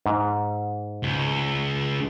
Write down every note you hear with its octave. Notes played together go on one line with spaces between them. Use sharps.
G#2
C#2